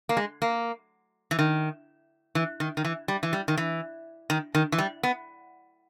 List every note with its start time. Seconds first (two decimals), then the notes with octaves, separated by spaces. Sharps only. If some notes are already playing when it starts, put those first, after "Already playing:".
0.09 A#3
0.17 G#3
0.42 A#3
1.31 E3
1.39 D#3
2.35 E3
2.60 D#3
2.77 D#3
2.85 E3
3.08 G3
3.23 E3
3.33 G3
3.48 D#3
3.57 E3
4.30 D#3
4.55 D#3
4.72 E3
4.78 G3
5.03 B3